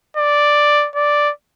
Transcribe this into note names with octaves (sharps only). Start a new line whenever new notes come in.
D5
D5